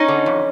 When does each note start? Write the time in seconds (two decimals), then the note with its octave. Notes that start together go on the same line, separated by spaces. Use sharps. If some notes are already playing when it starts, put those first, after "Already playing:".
Already playing: C#4 D#4
0.08 D3
0.26 F2